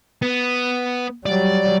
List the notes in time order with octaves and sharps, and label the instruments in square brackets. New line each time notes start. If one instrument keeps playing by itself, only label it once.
[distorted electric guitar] B3
[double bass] F#3 G3 [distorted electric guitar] D5